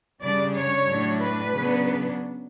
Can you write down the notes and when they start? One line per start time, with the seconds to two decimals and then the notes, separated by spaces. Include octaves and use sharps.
0.20 C#3 G3 D4 D5
0.54 C#5
0.87 A2 F#3 A3 D4
1.21 B4
1.55 C#3 F#3 B3 D4